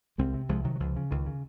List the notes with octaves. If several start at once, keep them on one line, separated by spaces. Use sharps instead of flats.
C2 G#3 C4
C3
C2 F3 G#3
C3 D#3 F#3
F#3
C#2 F3
C#3
C#2 D#3
C#3